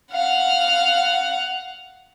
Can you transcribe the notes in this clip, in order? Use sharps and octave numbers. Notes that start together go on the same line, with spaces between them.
F5 F#5